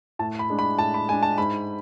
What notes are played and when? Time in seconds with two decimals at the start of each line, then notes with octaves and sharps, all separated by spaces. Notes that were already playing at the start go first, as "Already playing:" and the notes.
0.19 A2 A5
0.39 B5
0.50 G#3 D4
0.59 B5
0.79 A2 A5
0.94 B5
1.09 G#3 G#5
1.12 D4
1.23 A5
1.38 G#2 B5